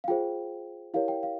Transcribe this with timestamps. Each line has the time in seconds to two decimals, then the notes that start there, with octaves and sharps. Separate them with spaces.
0.04 F5
0.08 F4 G#4 C5 G5
0.94 E4 G4 A#4 C#5 F5
1.08 G5
1.23 F5